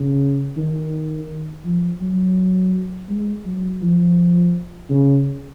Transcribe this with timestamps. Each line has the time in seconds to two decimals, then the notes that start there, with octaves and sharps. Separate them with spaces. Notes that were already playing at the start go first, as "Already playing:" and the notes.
Already playing: C#3
0.57 D#3
1.64 F3
2.01 F#3
3.09 G#3
3.45 F#3
3.82 F3
4.89 C#3